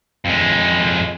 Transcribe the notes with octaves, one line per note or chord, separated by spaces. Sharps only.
F2 G#3